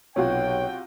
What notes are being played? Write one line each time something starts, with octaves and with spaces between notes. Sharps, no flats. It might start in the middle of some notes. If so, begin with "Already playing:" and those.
B1 C3 F4 F#4 C#5 G5